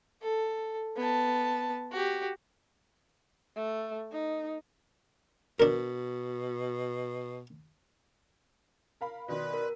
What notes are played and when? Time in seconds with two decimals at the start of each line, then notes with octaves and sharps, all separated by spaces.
0.22 A4
0.97 B3 A5
1.92 F#4 G4
3.56 A3
4.12 D#4
5.60 B2 D4 A#4
9.01 A#4 F5 B5
9.28 B2 D#3 B4 D5 C6
9.54 A#4